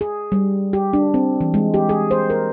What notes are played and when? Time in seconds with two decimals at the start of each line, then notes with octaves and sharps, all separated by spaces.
0.01 G#4
0.32 G3
0.73 G4
0.93 D4
1.14 C4
1.41 E3
1.54 G#3
1.74 G4
1.89 G#4
2.11 C5
2.30 A#4